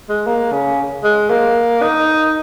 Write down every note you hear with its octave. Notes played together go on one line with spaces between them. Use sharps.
G#3
A#3
C#3
G#3
A#3
D#4